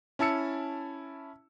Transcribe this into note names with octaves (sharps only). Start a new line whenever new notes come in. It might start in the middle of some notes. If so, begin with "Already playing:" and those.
C#4 E4 A5 E6 C#7